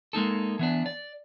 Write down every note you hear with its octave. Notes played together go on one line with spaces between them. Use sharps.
G#3 A#3 D#4 A4
E3 B3 D4
D5